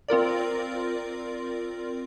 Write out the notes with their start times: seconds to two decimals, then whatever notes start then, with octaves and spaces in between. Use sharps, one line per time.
0.08 C4 F4 A#4 D5